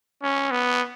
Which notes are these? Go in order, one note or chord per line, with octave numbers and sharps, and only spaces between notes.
C#4
B3